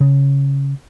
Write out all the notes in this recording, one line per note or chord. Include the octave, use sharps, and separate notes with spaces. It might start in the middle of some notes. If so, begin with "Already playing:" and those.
C#3